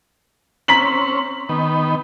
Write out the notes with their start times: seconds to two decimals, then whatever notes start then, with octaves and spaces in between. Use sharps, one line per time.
0.68 C4 C#4 A#5 B6 F#7
1.49 D#3 B3